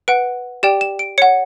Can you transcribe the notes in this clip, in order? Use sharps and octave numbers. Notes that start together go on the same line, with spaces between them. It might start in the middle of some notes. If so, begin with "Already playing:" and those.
B4 F#5 D7
G4 D5 G5 E7
E7
D7
C#5 F#5 C#7